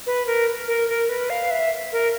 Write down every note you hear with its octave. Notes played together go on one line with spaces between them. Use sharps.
B4
A#4
A#4
A#4
B4
F5
E5
A#4